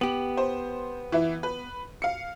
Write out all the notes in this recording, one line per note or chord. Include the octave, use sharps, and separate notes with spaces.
B3 G4 F#7
C5
E3 E4
B4
F5 C#7